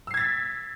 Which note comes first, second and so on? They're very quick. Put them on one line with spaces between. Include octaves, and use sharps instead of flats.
E6 C7 G#6 A6 B6